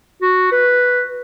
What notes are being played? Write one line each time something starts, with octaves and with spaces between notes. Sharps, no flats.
F#4
B4